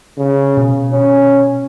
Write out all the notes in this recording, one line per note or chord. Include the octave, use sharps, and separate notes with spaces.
C#3
B2
C#4